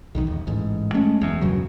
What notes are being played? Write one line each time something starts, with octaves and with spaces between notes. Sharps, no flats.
B1 E2 D#3
D#1
A1 G#2
G#3 A3 C#4
F#1 E2
E1 G2 C#3 F#3